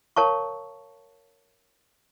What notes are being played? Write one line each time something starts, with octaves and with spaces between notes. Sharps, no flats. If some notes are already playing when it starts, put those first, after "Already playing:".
A#4 C#5 F5 A5 A#5 C#6